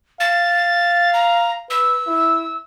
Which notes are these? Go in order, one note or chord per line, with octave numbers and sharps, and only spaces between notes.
F5 A6
A#5
B4 E6
E4